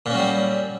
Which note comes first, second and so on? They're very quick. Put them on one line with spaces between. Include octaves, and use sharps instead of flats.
A#2 C#4 F#3 G3